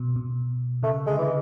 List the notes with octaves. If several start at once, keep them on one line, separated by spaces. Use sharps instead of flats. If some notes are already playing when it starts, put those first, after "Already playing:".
Already playing: B2
B2
C#3 A3
D3 G#3
E3